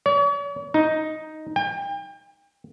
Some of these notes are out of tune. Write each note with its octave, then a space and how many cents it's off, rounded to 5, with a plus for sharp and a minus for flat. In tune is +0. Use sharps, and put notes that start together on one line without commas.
C#5 +45
D#4 +5
G5 +35